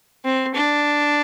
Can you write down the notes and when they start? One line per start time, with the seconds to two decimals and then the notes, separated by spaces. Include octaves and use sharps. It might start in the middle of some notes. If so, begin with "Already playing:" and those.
0.25 C4
0.55 D4